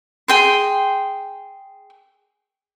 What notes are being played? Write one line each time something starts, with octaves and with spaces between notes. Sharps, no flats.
G#4 G5 C6